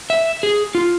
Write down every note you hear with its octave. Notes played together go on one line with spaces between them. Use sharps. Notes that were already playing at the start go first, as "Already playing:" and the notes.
E5
G#4
F4